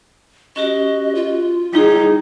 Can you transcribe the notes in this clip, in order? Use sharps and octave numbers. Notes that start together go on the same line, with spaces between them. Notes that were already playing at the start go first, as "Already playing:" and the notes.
C#4 F#4 G4 D#5
F4
G3 D#4 E4 G#4